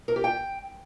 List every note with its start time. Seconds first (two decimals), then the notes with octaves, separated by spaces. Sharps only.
0.08 A#4
0.16 G4
0.24 G5